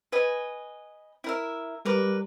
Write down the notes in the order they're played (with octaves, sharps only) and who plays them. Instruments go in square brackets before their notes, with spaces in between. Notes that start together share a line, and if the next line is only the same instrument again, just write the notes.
[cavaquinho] B4 D#5 G#5
E4 A#4 E5
[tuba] G3 [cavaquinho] A#4 B4 D6